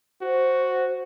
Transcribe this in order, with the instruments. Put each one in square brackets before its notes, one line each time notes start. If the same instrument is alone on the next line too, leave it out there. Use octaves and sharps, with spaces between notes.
[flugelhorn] F#4 [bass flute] C5